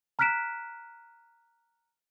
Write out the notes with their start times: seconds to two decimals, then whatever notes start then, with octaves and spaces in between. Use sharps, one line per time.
0.19 A#5 F6 F#6 B6 D7 E7